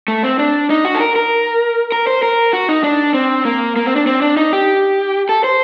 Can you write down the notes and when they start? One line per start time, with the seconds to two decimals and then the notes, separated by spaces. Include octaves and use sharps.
0.08 A3
0.23 C4
0.39 D4
0.70 D#4
0.85 F#4
0.95 A4
1.00 A#4
1.16 A#4
1.92 A#4
2.07 C5
2.23 A#4
2.53 F#4
2.69 D#4
2.84 D4
3.14 C4
3.45 A#3
3.76 A#3
3.86 C4
3.96 D4
4.07 C4
4.22 D4
4.37 D#4
4.53 G4
5.29 A4
5.44 C5